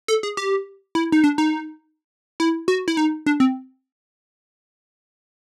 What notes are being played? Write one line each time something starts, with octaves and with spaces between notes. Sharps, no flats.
A4
G#4
G4
E4
D#4
D4
D#4
E4
F#4
E4
D#4
D4
C4